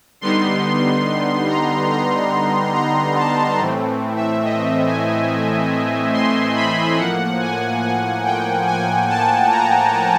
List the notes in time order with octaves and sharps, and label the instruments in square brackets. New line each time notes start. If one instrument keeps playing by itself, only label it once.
[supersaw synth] D3 G3 B3 D#4 C6
A#5
A#5
A#5
A5
A2 E3 A3 C4
E5
D#5
G#5
C6
B5
A2 F3 A#3 F#5
G#5
G#5
G5
G#5
A5
A#5